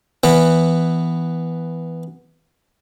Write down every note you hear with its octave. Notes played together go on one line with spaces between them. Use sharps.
E3 B3